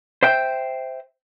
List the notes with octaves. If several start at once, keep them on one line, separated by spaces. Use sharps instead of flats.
C5 E5 G5